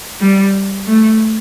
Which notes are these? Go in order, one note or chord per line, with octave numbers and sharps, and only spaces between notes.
G3
A3